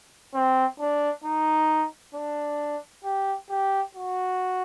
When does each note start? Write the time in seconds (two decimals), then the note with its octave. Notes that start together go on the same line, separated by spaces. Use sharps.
0.34 C4
0.80 D4
1.24 D#4
2.15 D4
3.05 G4
3.50 G4
3.95 F#4